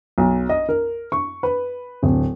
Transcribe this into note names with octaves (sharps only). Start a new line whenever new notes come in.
B1
D#5
A#4
C#6
B4
D1